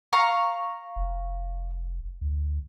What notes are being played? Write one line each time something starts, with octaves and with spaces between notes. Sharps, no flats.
F5 A#5 C#6
F1
D2